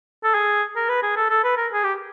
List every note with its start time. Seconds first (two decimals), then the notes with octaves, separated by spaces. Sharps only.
0.24 A4
0.34 G#4
0.76 A#4
0.89 B4
1.03 G#4
1.17 A4
1.30 A4
1.44 B4
1.57 A#4
1.73 G#4
1.84 G4